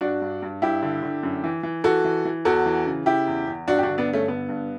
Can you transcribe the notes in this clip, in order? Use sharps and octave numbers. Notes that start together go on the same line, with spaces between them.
G2 D4 F#4
G2
G2
G2 E4 G4
D3
D3
F#2
E3
E3
E3 F#4 A4
E3
E3
E2 F#4 A4
E3
C#3
C#3 E4 G4
E2
E2
G2 D4 F#4
G4
D3 D4 F#4
B3 D4
G2
A3 C#4
D3 B3
G2